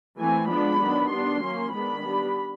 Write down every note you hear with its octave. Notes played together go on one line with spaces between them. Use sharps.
E3 A3 C4 G#5
F3 G#3 B3 D4 B5
D#3 F#3 B3 D4
G3 B3 D4 C6
F#3 A#3 C#4
D#3 G#3 B3 D4 B5
G3 B3 D4